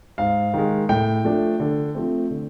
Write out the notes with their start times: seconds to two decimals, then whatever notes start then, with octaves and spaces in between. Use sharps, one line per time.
0.18 G#2 F5
0.54 D#3 G#3
0.89 A2 G5
1.25 F3 A3 D4
1.60 D3
1.95 F3 A3 C4
2.30 D3